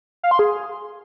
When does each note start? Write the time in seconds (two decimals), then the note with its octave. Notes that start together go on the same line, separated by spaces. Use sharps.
0.23 F5
0.31 C6
0.39 G#4